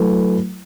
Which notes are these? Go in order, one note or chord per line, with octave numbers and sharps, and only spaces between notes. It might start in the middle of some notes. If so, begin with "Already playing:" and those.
Already playing: F#3 A3 E4 B4